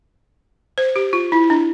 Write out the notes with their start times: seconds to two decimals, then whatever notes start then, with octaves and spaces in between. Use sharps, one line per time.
0.78 C5
0.96 G4
1.13 F4
1.32 E4
1.50 D4